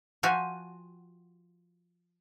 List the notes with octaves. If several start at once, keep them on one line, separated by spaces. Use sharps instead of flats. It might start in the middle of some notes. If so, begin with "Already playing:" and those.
F3 F4 F#4 G5 G#5